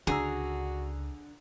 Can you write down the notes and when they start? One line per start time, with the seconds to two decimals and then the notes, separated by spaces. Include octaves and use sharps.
0.07 C#2 D3 F#4 G#4 A#5 E6